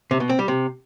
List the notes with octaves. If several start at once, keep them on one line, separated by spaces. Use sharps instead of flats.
C3
B2
C4
G3
C3